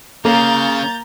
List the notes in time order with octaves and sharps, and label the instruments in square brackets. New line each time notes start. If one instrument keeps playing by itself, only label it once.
[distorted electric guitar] C#3 [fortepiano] A#3 [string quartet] A#5 G6 A6